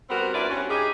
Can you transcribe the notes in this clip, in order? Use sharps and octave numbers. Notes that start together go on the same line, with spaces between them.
G3 B3 C4 F#4 A#4
D4 E4 F4 B4 D5
G2 C#4 F#4
C#4 D#4 G4 G#4